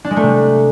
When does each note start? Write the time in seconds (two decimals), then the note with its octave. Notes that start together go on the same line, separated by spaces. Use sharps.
0.05 D4
0.11 G#3
0.17 A3
0.23 C3